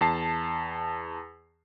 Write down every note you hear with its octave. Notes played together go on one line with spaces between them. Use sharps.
E2 A5 C7